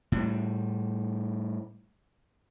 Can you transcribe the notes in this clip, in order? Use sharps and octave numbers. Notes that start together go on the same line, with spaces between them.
A2 G3